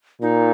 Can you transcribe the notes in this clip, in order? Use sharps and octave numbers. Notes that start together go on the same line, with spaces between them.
A#2 D#4